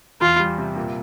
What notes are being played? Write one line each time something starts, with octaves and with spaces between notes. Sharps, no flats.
E2 F4
G3
C3
A#2